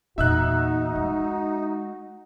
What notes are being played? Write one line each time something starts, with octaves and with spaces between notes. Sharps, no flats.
E2 A#2 D#4 F#4 E5 E6 F#6
G#3